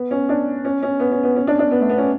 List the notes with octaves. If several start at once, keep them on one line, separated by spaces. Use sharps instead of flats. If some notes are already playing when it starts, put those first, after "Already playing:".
Already playing: B3
C#4
D4
C#4
C#4
B3
C#4
B3
C#4
D4
D4
B3
A3
B3
C#4